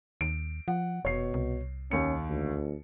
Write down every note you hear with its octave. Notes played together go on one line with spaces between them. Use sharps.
D#2 D7
F3 F#5
F1 B2 C#5 C7
C2
D#2 C#4 C#7
D2